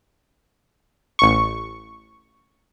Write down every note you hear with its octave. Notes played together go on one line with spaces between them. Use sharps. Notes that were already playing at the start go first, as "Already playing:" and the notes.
A1 C#6